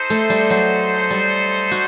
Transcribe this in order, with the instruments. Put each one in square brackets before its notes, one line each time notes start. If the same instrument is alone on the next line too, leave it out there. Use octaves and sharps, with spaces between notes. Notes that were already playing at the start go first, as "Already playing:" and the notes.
Already playing: [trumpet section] D#4 A4 C5
[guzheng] A3
G3
F#3
G3
F#4